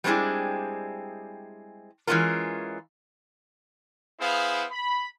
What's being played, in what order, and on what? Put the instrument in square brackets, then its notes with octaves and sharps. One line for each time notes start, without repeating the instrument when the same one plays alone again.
[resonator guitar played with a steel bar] G3 G#3 C4 D4 E4 G#4
E3 G#3 A3 C#4 F4 A#4
[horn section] B3 E4 G#4 C5 F5
B5